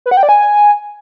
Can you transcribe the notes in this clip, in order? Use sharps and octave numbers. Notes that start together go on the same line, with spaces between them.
B4
F#5
G5
D5
G#5